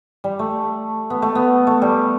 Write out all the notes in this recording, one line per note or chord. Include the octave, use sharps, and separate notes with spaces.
G3
A3
B3
A3
B3
A3
G3